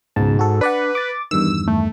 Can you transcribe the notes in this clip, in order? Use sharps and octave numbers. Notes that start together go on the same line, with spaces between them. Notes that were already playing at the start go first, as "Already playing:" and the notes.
C#2 G#2 B2 A5
F#4 A4
D4 B4 D5 F#5
D6 A6
E2 G2 D#3 E6
A3